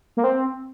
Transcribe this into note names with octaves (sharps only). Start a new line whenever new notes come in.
A#3
C4